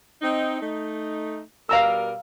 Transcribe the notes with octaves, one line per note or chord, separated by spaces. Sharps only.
C4 D#4
A3 D#4
B2 G3 A#4 F5 A#5 E6